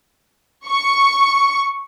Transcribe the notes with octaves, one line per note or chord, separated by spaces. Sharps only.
C#6